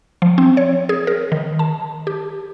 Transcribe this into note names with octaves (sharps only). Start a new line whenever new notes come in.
F3
C4
C#5
G#4
A#4
D#3
A5
G4